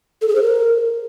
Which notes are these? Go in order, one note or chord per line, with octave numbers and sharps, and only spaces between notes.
A4
G#4
C5
A#4